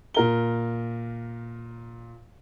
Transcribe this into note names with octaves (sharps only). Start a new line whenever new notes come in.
A#2 A#4 G7